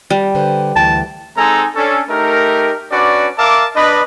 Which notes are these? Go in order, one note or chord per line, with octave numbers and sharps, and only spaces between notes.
G3
D3 B4 C5
D2 E3 G5 A5
G#3 C4 D#4 A4 G#5 A#5
C#4 D4 A4
A3 D#4 G4 A#4
C#4 D4 F#4 B4 D5
A#4 E5 F5 A5 D6
D4 B4 D#5